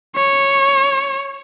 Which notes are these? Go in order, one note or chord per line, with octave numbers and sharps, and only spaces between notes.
C#5